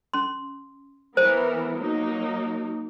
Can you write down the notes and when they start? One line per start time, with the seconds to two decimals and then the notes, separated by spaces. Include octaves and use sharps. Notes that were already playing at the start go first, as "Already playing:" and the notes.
0.14 C#4 C6
1.17 E3 B3 A#4 C5
1.78 F#3 A#3 D#4